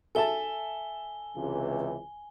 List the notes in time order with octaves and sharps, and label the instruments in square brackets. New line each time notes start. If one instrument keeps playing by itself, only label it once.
[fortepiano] A4 E5 A5 [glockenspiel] G#5 G7
[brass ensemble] C#2 C3 E3